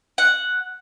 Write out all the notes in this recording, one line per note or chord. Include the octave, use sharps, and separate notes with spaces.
F#5